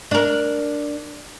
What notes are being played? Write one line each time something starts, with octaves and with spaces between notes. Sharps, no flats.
D4 A#4